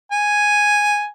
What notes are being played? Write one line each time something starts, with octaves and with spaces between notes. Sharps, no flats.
G#5